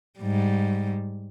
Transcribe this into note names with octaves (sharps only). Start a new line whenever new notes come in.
G#2 G3